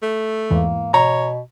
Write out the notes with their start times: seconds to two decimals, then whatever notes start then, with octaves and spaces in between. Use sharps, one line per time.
0.03 A3
0.50 E2 G#2 E3 A#3
0.94 B2 C#5 A#5